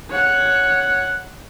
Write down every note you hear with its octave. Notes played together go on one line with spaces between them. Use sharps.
C#5 F#5